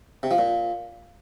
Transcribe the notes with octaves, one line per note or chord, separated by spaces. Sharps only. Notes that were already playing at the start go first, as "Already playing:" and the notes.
C3
F3
A#2